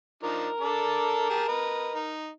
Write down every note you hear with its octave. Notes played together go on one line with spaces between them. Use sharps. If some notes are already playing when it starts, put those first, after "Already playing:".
F3 D4 D#4 A#4
D4 A4 D5
G4 G#4 A5
B4 D#5
D#4